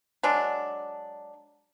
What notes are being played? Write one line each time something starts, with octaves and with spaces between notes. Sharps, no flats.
F#3 G#3 D4